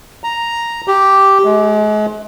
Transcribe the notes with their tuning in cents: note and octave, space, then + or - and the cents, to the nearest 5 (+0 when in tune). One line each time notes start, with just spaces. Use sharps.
A#5 +0
G4 -5
G#3 +35